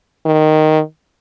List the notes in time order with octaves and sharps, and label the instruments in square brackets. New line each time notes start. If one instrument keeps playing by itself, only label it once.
[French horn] D#3